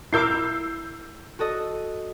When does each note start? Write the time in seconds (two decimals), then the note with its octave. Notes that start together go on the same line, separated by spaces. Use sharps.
0.13 E4 A#4 D6 E6 G6 C7
1.39 F#4 A4 D#5